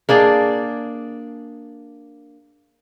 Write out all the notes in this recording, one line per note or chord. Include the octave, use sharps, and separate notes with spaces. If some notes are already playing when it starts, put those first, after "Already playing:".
A#3 D4 G#4 D5